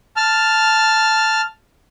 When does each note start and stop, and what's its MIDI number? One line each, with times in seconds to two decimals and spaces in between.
0.17 1.41 81
0.17 1.41 89